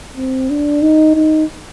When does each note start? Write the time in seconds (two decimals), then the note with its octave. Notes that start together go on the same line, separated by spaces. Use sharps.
0.17 C4
0.50 D4
0.82 D#4
1.15 D#4